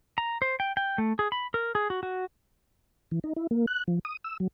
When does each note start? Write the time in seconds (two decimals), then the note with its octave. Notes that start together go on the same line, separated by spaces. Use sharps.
0.18 A#5
0.42 C5
0.60 G5
0.77 G5
0.98 A3
1.19 G#4
1.32 B5
1.54 A#4
1.75 G#4
1.90 F#4
2.03 F#4
3.11 E3
3.24 D#4
3.36 E4
3.51 A#3
3.67 F#6
3.88 F3
4.05 D#6
4.24 E6
4.40 F#3